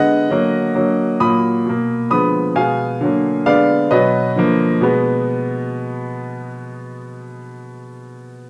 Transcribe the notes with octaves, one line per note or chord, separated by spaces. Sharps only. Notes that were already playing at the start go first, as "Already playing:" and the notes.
Already playing: D3 G#3 B3 D#5 F#5
D3 F#3 A#3
D3 F#3 A#3
A#2 F#3 A#3 B5 D#6
B2 A#3
D3 F3 G#3 B3 B5 D#6
B2 G#3 B3 F5 G#5
D3 F#3 A#3
D3 G#3 B3 D5 F5
B2 F#3 B3 B4 D#5
D3 F3 A#3
B2 G#3 B3